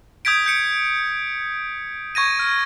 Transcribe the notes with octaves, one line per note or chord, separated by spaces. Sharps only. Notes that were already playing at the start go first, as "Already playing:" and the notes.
D#6 G6 G#6 B6 D7
G6 C#7 D7
C#6 G#6 A#6 D#7
F6